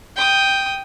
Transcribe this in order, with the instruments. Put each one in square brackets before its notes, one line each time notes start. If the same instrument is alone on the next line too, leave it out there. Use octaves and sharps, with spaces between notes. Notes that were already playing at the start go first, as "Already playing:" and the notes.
[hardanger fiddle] G5 D#6